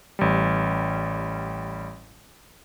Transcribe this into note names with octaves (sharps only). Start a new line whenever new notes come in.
A1 G3